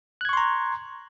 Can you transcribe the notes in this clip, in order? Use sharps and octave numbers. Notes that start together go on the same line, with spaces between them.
A#5 C6 C#6 F#6 G#6